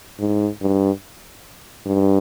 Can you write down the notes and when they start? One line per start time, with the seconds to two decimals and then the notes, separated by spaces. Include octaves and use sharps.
0.20 G#2
0.62 G2
1.86 G2